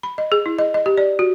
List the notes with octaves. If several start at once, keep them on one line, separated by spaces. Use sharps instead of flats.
B5
D#5
G#4
E4
D#5
D#5
G4
D5
F#4